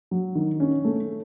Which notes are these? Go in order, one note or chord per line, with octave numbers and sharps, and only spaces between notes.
F#3
D#3
C#4
A3